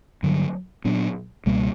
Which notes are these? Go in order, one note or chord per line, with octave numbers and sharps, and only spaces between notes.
G2 D3 F#3
A#2 F#3 B3 D4
C#2 B2 G3 A#3